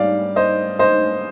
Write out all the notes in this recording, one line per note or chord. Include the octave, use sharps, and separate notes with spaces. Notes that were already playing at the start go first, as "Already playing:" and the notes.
Already playing: G#2 G3 D5 F5
C5 D#5
C5 D#5